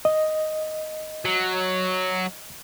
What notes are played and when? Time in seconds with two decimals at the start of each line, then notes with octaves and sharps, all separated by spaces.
0.05 D#5
1.25 F#3